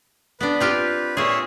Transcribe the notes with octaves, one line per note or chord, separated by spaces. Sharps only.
B3 D4 B4
C4 F4 G4
A#2 G#4 C#5 E5 C6